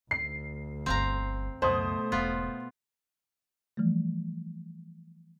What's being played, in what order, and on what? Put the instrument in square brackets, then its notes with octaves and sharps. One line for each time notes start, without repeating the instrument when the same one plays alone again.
[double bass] D2 [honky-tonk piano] C7
[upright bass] D1 G1 [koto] C4 F5 A#5
[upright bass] C#2 F#2 [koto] B2 [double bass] A3 [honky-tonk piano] C5 D#6
[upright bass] E1 G#2 [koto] B3 F4
[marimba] E3 F3 G3 A3